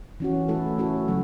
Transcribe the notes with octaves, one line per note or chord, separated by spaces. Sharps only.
E3 C#4 F#4
A3 E4 A4
A3 C#4 F#4 A4
C#3 F#3 A3